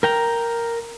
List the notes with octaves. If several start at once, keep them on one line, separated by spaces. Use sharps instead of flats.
A#4 G5 A#5